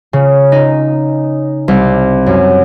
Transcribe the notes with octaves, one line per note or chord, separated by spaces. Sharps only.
C#3
D#4
C2
F#2